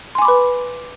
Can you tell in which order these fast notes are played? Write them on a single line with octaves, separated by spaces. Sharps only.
C6 G#5 D6 B5 B4